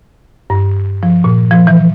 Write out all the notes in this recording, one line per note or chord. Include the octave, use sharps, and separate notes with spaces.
G2
F3
A#2
F3
E3